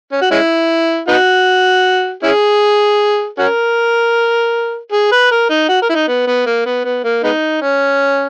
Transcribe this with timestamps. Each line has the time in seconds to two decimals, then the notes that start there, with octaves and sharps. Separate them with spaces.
0.12 C#4
0.22 F#4
0.31 G#3 C#4 E4
1.08 B3 D#4 F#4
2.23 C#4 E4 G#4
3.39 C#4 F#4 A#4
4.92 G#4
5.12 B4
5.31 A#4
5.50 D#4
5.69 F#4
5.82 A#4
5.90 E4
5.95 D#4
6.08 B3
6.27 B3
6.46 A#3
6.66 B3
6.85 B3
7.04 A#3
7.24 G#3 B3 D#4
7.62 C#4